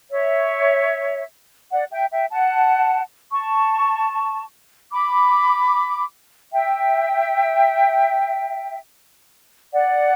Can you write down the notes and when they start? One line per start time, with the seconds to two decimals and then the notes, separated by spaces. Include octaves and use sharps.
0.11 C#5 E5
1.70 D5 F#5
1.90 E5 G5
2.11 E5 G5
2.31 F#5 A5
3.31 A5 C#6
4.91 B5 D6
6.53 E5 G5
9.72 D5 F#5